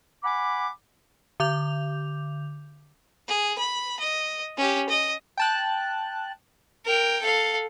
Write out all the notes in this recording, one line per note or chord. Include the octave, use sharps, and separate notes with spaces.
F#5 G#5 B5 D6
D3 D6 G6 F7
G#4
B5
D#5
C#4 G4
D#5
G5 A5 F#6
A#4 G5
A4 F5